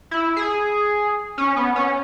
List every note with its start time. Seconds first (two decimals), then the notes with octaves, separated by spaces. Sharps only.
0.11 E4
0.36 G#4
1.38 C#4
1.56 B3
1.76 C#4